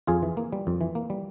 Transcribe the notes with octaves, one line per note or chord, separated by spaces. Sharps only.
F2 F4 G#4
E3
A#3
G3
F2
E3
A#3
G3